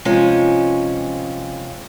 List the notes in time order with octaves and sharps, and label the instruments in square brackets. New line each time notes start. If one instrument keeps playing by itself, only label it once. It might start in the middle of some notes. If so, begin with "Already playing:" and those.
[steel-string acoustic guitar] C3 F3 G#3 C#4